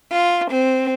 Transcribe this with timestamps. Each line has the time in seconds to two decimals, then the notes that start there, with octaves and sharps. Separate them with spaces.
0.12 F4
0.50 C4